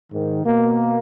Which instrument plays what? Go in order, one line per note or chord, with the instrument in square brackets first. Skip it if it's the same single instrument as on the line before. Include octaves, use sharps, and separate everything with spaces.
[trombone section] G#2 D#3
B2 A#3